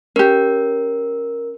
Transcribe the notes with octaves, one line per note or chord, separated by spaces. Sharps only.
C#4 G4 A#4